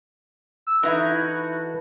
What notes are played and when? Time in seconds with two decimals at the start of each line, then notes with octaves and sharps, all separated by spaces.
0.67 E6
0.83 E3 D#4 E4 F#4 A4 B4